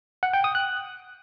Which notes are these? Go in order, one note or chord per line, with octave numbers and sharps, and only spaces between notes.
F#5
G5
D#6
F#6